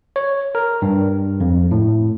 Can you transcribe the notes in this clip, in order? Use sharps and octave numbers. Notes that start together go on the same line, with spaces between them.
C#5
A#4
G2
F2
A2